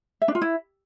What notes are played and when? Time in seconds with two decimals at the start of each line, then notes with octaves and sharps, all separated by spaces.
0.22 E5
0.28 D4
0.35 F4
0.42 E4